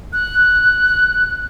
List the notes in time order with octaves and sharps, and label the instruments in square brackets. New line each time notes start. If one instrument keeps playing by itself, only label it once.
[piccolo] F#6